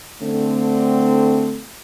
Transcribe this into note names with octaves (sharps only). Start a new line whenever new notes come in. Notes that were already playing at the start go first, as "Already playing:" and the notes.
D3 A3 C4